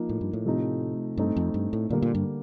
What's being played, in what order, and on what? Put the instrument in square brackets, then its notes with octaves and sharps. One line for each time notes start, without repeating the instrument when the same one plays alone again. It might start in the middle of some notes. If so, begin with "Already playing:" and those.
Already playing: [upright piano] F3 A#3 D#4
[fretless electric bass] A2
G2
A2
[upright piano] C3 F3 A3 C4 D#4
[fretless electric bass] G2 [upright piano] A3 C4 D#4
[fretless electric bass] F2
G2
A2
[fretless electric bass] A#2 [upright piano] D3 G3 A#3
[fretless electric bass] A#2
G2